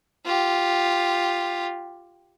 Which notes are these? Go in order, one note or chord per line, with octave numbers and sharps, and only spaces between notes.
F4 G4